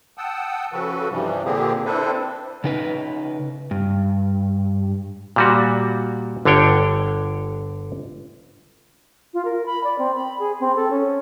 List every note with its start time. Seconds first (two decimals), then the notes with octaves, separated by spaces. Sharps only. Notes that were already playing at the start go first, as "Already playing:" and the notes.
0.18 F#5 G5 A5 D#6 E6
0.73 C#3 F3 F#4 A4 B4
1.10 G2 C3 E3 F3 G3
1.45 A#2 D3 A#3 C4 G4 G#4
1.86 C4 D4 E4 A4 B4 C5
2.64 C#3 D#4 B4
3.71 G2
5.36 A#2 G3 F#4
6.45 G1 D3 D4 C#5 G5
9.34 F4
9.45 A#4
9.66 B5
9.84 D5
9.99 C4
10.16 B5
10.39 G#4
10.60 C4
10.76 A4
10.91 C#4